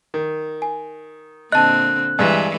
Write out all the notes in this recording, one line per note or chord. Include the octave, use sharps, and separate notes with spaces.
D#3
G#5
A#2 D3 C4 D#5 A5 F#6
G2 E3 G#3